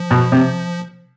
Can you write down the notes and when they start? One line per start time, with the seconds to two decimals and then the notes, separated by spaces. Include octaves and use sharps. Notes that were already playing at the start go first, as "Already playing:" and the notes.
Already playing: F3
0.11 B2
0.32 C3